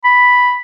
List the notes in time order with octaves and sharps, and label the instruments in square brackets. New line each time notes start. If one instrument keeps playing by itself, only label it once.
[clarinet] B5